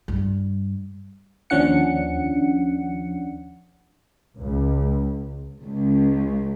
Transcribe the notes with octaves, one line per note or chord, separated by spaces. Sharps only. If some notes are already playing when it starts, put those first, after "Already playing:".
G2 G3
D#2 F3 C#4 D4 F#5 C#7
C#2
C#2